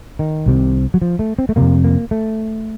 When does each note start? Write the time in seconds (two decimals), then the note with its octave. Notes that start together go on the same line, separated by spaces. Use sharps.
0.19 D#3
0.46 C2 C3
0.94 F#3
1.02 F3
1.19 A3
1.39 C4
1.49 A3
1.56 F2 C3 A#3
1.84 A#3
2.11 A3